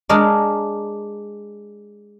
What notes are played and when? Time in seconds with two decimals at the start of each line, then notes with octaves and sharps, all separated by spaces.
0.09 G#3 D4 G#4 A#4